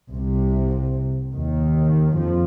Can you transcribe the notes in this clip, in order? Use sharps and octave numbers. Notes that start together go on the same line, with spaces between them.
C2 C3
D#2 D#3
F2 F3